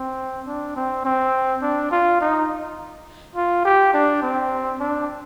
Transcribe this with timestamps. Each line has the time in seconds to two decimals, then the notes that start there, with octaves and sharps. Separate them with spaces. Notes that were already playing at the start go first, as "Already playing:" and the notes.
Already playing: C4
0.47 D4
0.76 C4
1.05 C4
1.62 D4
1.91 F4
2.21 D#4
3.35 F4
3.65 G4
3.94 D4
4.22 C4
4.80 D4